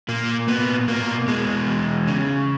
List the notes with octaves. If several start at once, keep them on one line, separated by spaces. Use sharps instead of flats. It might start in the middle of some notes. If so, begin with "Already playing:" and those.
A#2 A#3
A#2 B3
B2 A#3
B2 G#3
E2
C#3